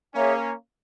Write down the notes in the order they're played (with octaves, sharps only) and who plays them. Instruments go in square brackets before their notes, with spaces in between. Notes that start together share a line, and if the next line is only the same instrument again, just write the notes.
[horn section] A#3 C#4 [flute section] G#4 C#5 E5 G#5